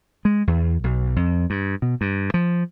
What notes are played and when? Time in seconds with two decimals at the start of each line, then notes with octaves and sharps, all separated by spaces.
0.25 G#3
0.47 E2
0.84 B1
1.16 F2
1.50 G2
1.82 B2
2.01 G2
2.34 F3